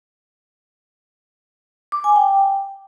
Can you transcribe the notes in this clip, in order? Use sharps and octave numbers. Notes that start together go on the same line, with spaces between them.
D6
G#5
G5